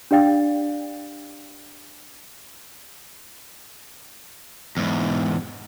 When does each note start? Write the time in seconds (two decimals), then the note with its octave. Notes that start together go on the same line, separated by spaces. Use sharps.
0.11 D4 G4 D5 F5 G5 A6
4.77 E2 G#2